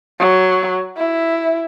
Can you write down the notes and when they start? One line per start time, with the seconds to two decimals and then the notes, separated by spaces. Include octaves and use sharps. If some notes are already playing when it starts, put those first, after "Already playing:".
0.20 F#3
0.97 E4